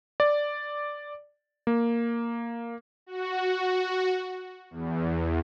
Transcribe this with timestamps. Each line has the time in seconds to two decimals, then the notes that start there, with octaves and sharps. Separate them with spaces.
0.20 D5
1.67 A#3
3.06 F#4
4.70 E2